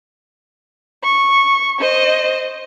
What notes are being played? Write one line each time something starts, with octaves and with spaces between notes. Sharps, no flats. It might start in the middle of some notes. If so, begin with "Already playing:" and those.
C#6
C5 D#5